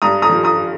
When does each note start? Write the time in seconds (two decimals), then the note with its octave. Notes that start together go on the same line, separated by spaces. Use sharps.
0.02 G2 A#5 D#6
0.22 A#5 D#6
0.29 F3
0.43 A#5 D#6